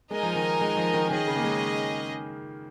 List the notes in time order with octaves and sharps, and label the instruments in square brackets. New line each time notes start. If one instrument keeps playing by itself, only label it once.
[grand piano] G#3 [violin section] D#4 A#4 D#5 G#5
[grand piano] F3
D#3
G#3
F3
D#3
[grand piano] D#3 [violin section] C#4 G#4 D#5
[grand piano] C#3
A#3
G#3